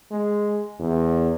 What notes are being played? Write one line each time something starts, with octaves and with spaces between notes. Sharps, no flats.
G#3
E2